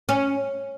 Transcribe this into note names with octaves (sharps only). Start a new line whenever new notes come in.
C#4